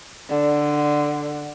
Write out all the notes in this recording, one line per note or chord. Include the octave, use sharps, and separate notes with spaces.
D3